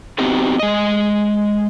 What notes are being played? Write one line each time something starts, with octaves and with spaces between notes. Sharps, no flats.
B3 C4 D#4 F#4 G4
G#3 D#5